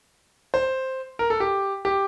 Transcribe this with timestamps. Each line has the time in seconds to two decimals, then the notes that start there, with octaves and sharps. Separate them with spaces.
0.54 C5
1.19 A#4
1.30 A4
1.40 G4
1.85 G4